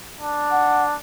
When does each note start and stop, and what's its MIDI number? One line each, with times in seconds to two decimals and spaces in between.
0.21 0.97 62
0.51 0.84 78